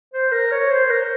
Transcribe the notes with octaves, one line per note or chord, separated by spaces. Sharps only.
C5
A#4
C#5
C5
A#4